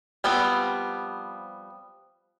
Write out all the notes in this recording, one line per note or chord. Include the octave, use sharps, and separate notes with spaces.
F3 G3 B3 C4